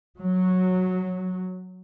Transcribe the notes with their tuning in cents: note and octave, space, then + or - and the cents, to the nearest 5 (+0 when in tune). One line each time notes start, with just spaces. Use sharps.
F#3 -5